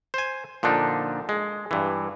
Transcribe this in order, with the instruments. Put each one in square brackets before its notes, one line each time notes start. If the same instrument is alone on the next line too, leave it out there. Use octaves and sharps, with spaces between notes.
[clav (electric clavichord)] C5 G#5
A#2 D3 F3 D4 D#4
G#3
G2 E3